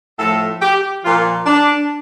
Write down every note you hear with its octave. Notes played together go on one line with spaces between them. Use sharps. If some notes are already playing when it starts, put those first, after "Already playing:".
A2 F3 A4
G4
A#2 F3 F4
D4